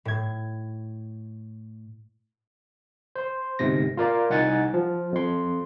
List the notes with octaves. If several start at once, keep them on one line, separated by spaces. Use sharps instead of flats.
A2 G#6
C5 C6
G1 G#2 C3 A#6
F4 A#4 D5
C2 D#4 F#5 G#5 A6
F3
F2 C6